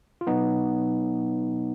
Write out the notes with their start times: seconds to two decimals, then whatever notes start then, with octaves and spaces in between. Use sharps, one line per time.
0.21 F4
0.27 B2 F#3 B3 D#4